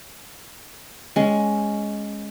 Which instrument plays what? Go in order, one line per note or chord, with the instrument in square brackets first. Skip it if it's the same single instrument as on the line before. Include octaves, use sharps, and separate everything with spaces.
[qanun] G#3 C#4